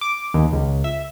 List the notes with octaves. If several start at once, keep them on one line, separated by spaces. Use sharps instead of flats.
D6
D#2
C#2
E5